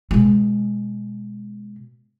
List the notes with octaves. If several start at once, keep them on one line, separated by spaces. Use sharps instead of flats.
B2 G#3